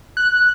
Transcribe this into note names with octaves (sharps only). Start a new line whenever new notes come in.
F#6